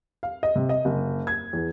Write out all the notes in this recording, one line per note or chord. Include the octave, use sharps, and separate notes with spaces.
F5
D#5
C3
D#5
F#1
G#6
E2